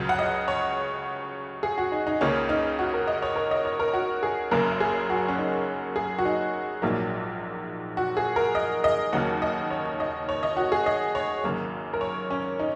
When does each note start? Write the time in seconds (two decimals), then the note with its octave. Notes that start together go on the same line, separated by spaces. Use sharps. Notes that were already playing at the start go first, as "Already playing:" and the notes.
Already playing: C#2 C#3 F#3
0.09 F#5
0.19 D#5
0.48 C#5
1.63 G#4
1.78 F#4
1.92 D#4
2.07 D#4
2.21 C#2 C#3 A#3 C#4
2.49 D#4
2.79 F#4
2.94 A#4
3.07 D#5
3.22 C#5
3.36 A#4
3.51 D#5
3.65 C#5
3.80 A#4
3.94 F#4
4.23 G#4
4.51 F#1 F#2 C#3 A#3 A#4
4.80 G#4
5.10 F#4
5.28 C#4
5.38 D#4
5.96 G#4
6.18 F#4
6.25 D#4
6.82 A#1 G#2 F#3 A#3
7.97 F#4
8.17 G#4
8.36 A#4
8.55 D#5
8.84 D#5
9.12 D#2 C#3 F#3 A#3 F#5
9.42 D#5
9.70 C#5
10.00 D#5
10.29 C#5
10.43 D#5
10.57 F#4
10.72 G#4
10.86 D#5
11.15 C#5
11.44 G#1 F#2 C#3 A#3
11.93 A#4
12.01 C#5
12.30 C#4
12.59 D#4